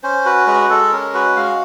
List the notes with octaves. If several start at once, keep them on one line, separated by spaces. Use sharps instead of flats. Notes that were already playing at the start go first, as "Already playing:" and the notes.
C#4 C5
F#4 B4
G#3 B4
G#3 A4
C#4 A#4
F#4 B4
G#3 F5